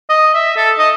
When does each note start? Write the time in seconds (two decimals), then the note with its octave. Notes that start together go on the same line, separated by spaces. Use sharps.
0.10 D#5
0.34 E5
0.57 A4
0.79 D#5